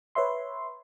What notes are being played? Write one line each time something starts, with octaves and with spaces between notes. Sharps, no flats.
B4 C#5 E5 C6